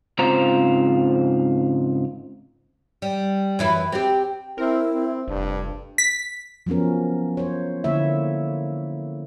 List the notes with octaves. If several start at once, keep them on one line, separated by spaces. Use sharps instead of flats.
G#2 C#3 C4 F4 C5 A#5
G3
F#2 E3 E4
C4 G4
C4 E4 A#4
C4
F1 G2 D4
B6
F3 F#3 B3 C#4 A#4
C5 C#5
D3 A#3 E4 C#5 E5